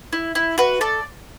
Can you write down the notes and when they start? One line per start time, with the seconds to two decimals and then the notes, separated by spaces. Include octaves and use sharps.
0.13 E4
0.35 E4
0.58 F#4 B4
0.81 A4 D5